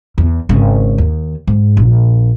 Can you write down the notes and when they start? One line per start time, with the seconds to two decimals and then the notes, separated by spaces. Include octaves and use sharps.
0.18 E2
0.49 G#1 C#3
0.98 D#2
1.47 G#2
1.77 A#1